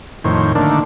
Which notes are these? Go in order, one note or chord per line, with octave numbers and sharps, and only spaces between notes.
F2 A2 D#3 C5 C#5
D3 D#3 A3 A#3 D4